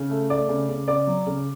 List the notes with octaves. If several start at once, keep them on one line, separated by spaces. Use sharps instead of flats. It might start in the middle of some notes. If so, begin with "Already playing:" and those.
Already playing: C#3
A3
A3 D5 D6
C#3
C#3
C#3 D5 D6
F#3
C#3